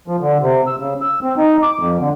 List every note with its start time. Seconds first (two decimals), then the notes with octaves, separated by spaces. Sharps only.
0.08 F3
0.21 D3
0.42 C3
0.67 E6
0.79 C#3
1.01 E6
1.22 C4
1.37 D#4
1.63 D6
1.79 F2
1.99 D3